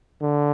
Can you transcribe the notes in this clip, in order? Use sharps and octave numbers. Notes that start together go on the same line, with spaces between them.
D3